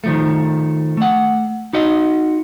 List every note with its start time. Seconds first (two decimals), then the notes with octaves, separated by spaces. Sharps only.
0.04 D#3 F3 A3
0.97 A3 F#5
1.73 D#4 F#4 D#5